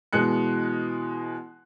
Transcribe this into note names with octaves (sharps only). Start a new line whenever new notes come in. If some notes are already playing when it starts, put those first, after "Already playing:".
B2 E3 G#3 F#6 C#7